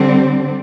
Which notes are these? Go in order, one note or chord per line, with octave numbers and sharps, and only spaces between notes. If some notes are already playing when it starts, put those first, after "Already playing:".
Already playing: D3 G3 C4